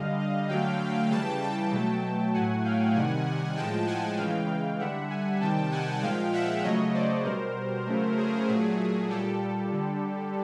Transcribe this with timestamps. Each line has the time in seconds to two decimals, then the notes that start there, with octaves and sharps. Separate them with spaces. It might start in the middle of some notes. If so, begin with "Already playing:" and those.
Already playing: D3 G3 D#5 F5
0.18 D#5 F5
0.49 D3 F#3 A3 F5 G5
1.10 C#3 E3 G3 G5 A5
1.42 G5 A5
1.72 B2 F#3 A3
2.33 A2 F#3 A3 F#5 G#5
2.64 F5 G5
2.95 C3 D#3 G3 F#5 G#5
3.56 A2 F3 G#3 G5 A5
3.87 F#5 G#5
4.17 C#3 E3 G#3 F5 G5
4.79 D3 G3 E5 F#5
5.10 F#5 G#5
5.40 C3 D#3 G3 G5 A5
5.71 F#5 G#5
6.02 A#2 F3 G#3 F5 G5
6.33 E5 F#5
6.63 C#3 F#3 A3 C#5 D#5
6.94 C5 D5
7.24 B2 G3 A#4 C5
7.86 C#3 F#3 A3
8.17 G#4
8.48 A#2 F#3 A3
9.09 A#2 G3 G4 A4
9.71 D3 G3